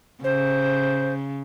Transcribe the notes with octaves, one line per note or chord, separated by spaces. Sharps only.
C#3 C5